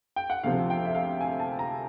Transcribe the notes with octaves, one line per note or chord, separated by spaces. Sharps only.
G5
F#5
D2 C3 F3 F5
G5
E5
F5
G#5
A5
A#5